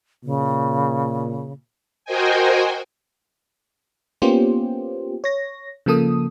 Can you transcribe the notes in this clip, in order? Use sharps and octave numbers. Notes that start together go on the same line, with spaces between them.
A#2 C#3
F#4 A#4 C5 D#5 G5 G#5
A#3 B3 C#4 F4 G4 C5
C#5 A#6
C#3 F3 A#3 A4 D#6